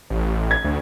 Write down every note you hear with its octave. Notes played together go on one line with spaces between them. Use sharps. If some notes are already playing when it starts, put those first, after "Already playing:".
A1
G#6
D2